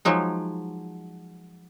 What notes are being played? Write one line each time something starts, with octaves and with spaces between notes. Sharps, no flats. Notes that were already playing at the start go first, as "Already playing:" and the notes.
F3 F#3 G#3 D#4